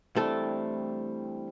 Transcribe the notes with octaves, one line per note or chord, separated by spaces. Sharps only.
G2 E3 G3 A3 C4 E4 A4